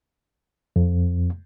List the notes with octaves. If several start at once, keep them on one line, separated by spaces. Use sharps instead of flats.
F2